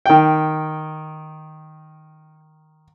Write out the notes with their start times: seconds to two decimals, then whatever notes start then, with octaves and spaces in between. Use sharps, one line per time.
0.06 D#3 G5